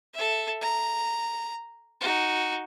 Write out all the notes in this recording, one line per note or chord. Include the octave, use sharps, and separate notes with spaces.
A4 E5
A#5
D#4 F#4